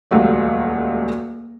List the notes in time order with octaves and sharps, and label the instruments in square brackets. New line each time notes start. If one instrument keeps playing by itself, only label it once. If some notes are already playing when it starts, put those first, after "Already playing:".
[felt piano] D#1 C#2 F#3 G3 A3 D5